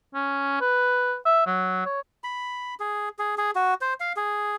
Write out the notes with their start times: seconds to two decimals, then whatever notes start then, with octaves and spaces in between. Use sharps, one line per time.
0.15 C#4
0.61 B4
1.26 E5
1.46 F#3
1.86 C#5
2.24 B5
2.80 G#4
3.19 G#4
3.38 G#4
3.55 F#4
3.81 C5
4.00 F5
4.17 G#4